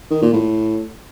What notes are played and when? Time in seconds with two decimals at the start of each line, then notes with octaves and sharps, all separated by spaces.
0.11 D#3
0.22 A#2
0.33 A2